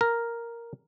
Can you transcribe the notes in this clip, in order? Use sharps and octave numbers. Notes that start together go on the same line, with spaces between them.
A#4